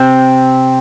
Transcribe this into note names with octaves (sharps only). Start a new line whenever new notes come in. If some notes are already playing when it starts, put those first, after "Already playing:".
Already playing: C3 C4